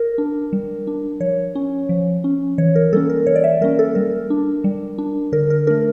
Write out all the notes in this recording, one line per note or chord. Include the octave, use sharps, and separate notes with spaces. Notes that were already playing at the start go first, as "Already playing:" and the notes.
Already playing: A#4
D4
G3
D4
F3 C#5
C#4
F3
C#4
E3 C#5
A#4
G3 A#3 C#4 A4
A#4
E3 C#5
D5
E5
G3 A#3 C#4 A#4
A4
G3 A#4
D4
G3
D4
D3 A#4
A#4
A3 D4 A#4